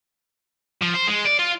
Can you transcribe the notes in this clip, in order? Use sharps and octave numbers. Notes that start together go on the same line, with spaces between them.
F3
C5
G#3
D5
F4